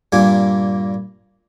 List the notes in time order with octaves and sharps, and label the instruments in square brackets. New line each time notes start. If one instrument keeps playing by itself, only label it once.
[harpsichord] G2 A#2 A#3 G#5